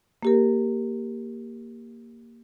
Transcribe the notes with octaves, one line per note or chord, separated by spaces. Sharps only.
A#3 G4 A#4